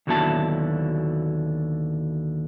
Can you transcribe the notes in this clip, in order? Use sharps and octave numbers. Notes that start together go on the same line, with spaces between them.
D#2 B2 D3 F#3 E4 A5